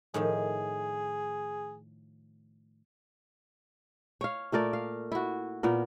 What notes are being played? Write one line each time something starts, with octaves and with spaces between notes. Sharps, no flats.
A2 D#3 F3 G#4
C#5 F5
A#2 A3 A#4 D5
F5
E4 F#4
A#2 B3 A#4